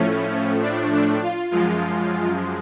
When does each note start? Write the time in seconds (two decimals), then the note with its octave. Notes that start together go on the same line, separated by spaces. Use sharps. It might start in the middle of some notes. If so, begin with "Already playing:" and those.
Already playing: A2 F3 A3 C#4
0.62 D4
0.92 D4
1.22 F4
1.51 F#2 F3 G#3 F4